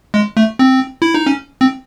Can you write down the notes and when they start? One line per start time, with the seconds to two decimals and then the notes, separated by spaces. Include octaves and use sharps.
0.14 G#3
0.37 A3
0.59 C4
1.02 E4
1.14 D#4
1.27 C#4
1.61 C4